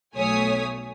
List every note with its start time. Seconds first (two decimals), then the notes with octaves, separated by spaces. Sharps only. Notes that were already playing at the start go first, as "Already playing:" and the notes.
0.14 B1 A3 C#5 G#5 D#6 B6